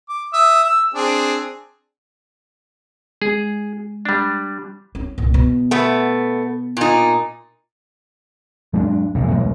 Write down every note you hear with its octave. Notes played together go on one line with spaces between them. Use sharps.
D6
E5 D#6 E6
E6
C4 D4 G#4
G#3 G#4
G3 D4
C#4
C2 A#2
B2
A3 B3
A#2 D#4
F#3 G#3 C#4 D4
E1 A#1 F#2 A2
E1 A2 F#3 G#3